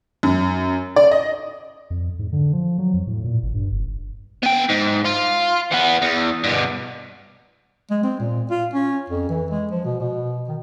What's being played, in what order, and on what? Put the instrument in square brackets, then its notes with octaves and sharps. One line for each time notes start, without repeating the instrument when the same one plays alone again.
[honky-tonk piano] F#2
D5
D#5
[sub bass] F2
G#2
D3
F3
F#3
F2
A2
A#2
G#1
G2
F#1
[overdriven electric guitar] B3 G5
G#2
F4
E3 B3
E2
G2 B2
[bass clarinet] G#3
C4
A#2
F4
C#4
F2
E3
G#3
F3
B2
B2
D#3